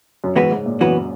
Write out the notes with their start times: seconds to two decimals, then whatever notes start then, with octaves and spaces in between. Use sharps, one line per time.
0.24 F#2
0.36 G#2 E3 B3 F#4 B4
0.52 G#2
0.66 A#2
0.80 F#2 E3 B3 F#4 B4